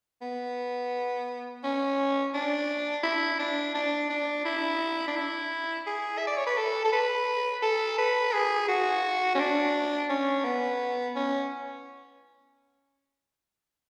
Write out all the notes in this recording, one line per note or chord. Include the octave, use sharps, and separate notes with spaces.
B3
C#4
D4
E4
D4
D4
D4
E4
D4
E4
G#4
E5
D5
C#5
B4
A4
A4
B4
A4
B4
G#4
F#4
C#4
D4
C#4
B3
C#4